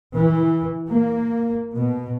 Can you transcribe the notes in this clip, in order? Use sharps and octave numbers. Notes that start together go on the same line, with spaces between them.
E3
A#3
B2